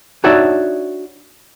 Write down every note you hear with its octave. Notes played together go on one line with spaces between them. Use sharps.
D4 D#4 F#4 C#5 D5 E5